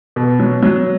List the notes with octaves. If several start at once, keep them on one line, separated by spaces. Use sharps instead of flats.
B2
F#3
F#3